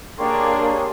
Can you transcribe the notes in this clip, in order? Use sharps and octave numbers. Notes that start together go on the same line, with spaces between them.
A#3 D4 G4 G#4 C#5 C6